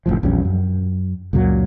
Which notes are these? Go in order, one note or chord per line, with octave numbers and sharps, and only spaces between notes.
F#1 B1 A2 F3
A#1 E2 G3 C#4
F#2
C#2 F#2 A#2 F#3